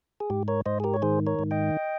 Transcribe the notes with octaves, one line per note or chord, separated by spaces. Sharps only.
G#4
G#2 G4
A#4 C#5
G#2 C5 D#5
G#4
G4 A#4
C#5
D#3 G#4 C5
A#4 C#5
G#2
D#5 G5